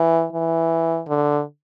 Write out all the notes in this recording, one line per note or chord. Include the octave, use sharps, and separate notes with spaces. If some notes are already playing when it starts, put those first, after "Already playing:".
Already playing: E3
E3
D3